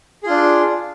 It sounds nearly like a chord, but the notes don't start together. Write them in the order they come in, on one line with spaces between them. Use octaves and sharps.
G#4 F4 D4